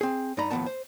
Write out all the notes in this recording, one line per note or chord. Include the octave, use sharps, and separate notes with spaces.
C4 G#4
G2 D#4 D5 D#5 A#5 B5
D#2 A2 E3 F3 B3 A5
C5